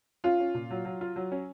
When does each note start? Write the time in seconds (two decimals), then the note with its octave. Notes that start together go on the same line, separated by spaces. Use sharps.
0.24 C#4 F4
0.40 C#4
0.54 A#2
0.71 F#3
0.85 F#3
1.01 F4
1.16 F#3
1.32 C#4